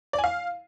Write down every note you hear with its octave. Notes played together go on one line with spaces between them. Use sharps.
D5
G#5
F5